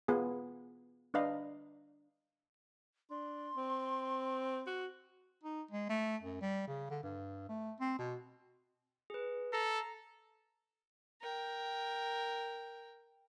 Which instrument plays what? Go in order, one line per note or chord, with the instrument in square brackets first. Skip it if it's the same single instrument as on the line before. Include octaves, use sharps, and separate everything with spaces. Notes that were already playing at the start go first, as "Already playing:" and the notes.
[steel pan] B3 F4 G#4
D4 B4 D#5 F5
[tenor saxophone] D4 [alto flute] C6
[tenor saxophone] C4
F#4
[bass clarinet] D#4
G#3
A3
F#2
G3
C#3
D3
G2
A3
C4
B2
[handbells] G#4 B4
[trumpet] A4 [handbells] A#5 A#6 C7
[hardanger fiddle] A#4 G5